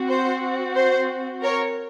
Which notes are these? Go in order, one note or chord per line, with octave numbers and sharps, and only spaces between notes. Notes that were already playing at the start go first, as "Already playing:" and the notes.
Already playing: C4 F#4
C5
C5
A#4 C#5